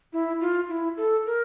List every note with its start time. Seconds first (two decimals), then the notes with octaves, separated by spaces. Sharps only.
0.13 E4
0.41 F4
0.69 E4
0.97 A4
1.26 A#4